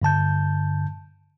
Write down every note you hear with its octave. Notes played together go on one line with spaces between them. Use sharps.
G2 D3 A5 G6